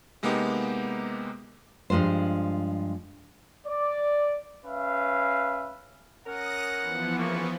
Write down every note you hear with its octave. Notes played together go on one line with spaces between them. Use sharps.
C3 G#3 A#3 B3 D#4 G4
G2 F3 G#3 F4 C5
D5
C#4 B4 E5 F5
C#4 A#4 F#5 D#6 A#6
E3 F3 B3
C#3 A#3 C#6